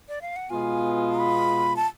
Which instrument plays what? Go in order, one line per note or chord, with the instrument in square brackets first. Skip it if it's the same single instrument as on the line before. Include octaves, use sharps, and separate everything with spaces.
[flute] D5
F5
F#5
[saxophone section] B2 G#3 B3 F4 [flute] G#5
[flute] B5
A5